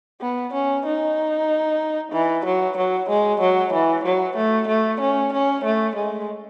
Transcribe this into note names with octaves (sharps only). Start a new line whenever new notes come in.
B3
C#4
D#4
E3
F#3
F#3
G#3
F#3
E3
F#3
A3
A3
C#4
C#4
A3
G#3